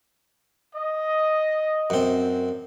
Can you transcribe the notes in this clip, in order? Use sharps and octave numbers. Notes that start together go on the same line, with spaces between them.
D#5
F#2 C4